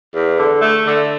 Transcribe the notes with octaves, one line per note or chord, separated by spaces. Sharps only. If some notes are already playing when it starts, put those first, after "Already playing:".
E2
D3
A3
D3